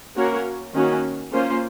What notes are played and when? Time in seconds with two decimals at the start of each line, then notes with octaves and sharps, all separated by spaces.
0.16 A#3 C#4 F#4 A#4 C#5
0.74 D#3 A#3 C#4 F#4
1.32 A#3 C#4 F4 C5